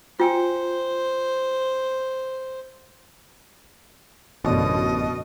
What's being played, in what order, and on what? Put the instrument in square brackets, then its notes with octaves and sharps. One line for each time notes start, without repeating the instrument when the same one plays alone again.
[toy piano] F4 G5 G#5 [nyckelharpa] C5
[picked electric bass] A1 [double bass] F#2 D3 [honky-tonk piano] B2 [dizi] D#5